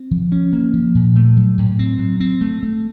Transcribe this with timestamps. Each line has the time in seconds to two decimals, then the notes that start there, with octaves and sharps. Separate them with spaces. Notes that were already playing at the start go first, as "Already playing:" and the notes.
Already playing: C4
0.11 F3
0.32 C#4
0.53 A#3
0.73 F3
0.95 A#2
1.16 A3
1.37 F#3
1.58 A2
1.79 C4
1.99 F#3
2.20 C4
2.41 A3
2.63 A3